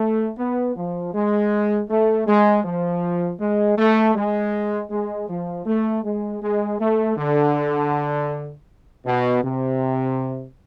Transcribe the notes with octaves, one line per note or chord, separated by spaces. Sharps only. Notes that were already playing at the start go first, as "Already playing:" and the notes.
Already playing: A3
B3
F3
G#3
A3
G#3
F3
G#3
A3
G#3
G#3
F3
A3
G#3
G#3
A3
D3
B2
C3